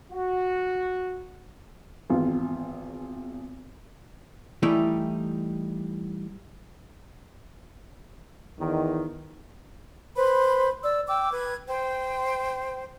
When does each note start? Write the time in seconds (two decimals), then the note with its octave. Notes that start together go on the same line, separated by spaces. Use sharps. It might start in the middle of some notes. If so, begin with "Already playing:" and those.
0.11 F#4
2.10 G#1 E2 F4
4.63 E3 G3 A3 D#4 E4 G5
8.59 E2 D#3
10.16 B4 C5 B5
10.83 D5 E6
11.07 G5 D6 E6
11.33 B4 G#6
11.67 C5 G5